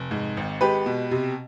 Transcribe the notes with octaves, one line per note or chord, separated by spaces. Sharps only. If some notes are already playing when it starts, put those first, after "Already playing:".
Already playing: F1
G#2
G#1
G#3 G4 B4
B2
C3